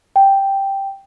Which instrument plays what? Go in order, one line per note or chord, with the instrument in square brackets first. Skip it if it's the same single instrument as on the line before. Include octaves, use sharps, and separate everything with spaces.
[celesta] G5